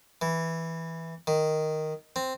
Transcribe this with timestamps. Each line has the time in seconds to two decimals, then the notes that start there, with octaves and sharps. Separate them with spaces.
0.22 E3
1.27 D#3
2.16 C4